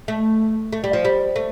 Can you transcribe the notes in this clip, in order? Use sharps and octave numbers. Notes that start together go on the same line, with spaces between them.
A3
A3
G3
F3
G3
A3